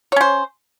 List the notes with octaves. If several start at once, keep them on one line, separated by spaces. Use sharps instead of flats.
C#4 C5 C#5